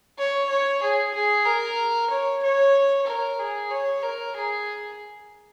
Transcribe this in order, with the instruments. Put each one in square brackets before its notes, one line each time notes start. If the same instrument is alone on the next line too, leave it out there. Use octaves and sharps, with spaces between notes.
[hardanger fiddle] C#5
C#5
G#4
G#4
A#4
C#5
C#5
A#4
G#4
C#5
A#4
G#4